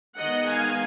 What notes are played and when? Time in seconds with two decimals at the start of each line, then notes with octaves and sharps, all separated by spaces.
0.19 D#3 G#3 B3 D#5 F#5
0.48 F5 G#5